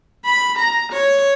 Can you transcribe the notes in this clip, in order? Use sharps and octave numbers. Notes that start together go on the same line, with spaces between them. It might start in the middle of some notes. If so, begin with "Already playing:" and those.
B5
A#5
C#5